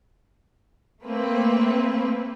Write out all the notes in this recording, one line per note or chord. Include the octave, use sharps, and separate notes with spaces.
A3 A#3 C4 B4